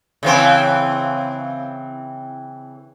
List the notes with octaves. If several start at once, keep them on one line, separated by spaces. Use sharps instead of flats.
C#3 E3 C4